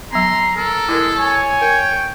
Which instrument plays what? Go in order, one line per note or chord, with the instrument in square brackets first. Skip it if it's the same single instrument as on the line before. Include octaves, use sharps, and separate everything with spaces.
[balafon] F#3 B3 [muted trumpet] A#5 [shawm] C6
[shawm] A4 [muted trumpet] A#4
[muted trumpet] G#3 [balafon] E4 A#4
[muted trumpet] C#5 [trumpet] G#5
[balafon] A#4 [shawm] G5